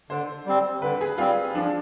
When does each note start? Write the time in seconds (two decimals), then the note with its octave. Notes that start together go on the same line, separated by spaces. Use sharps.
0.10 D3 C5
0.46 G3 C4
0.82 D3 B4
1.01 G#4
1.18 G3 C4 F4
1.55 F3 D4